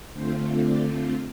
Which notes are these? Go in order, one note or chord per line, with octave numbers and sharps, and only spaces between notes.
D3 A3 C4 F4 C5
D5